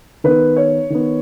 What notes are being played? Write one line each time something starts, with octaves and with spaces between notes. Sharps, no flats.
D#3 B3 B4
C#5
D#3 B3